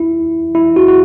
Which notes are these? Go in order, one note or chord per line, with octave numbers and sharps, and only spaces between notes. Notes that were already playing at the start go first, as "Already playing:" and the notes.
Already playing: E4
E4
F#4
F#4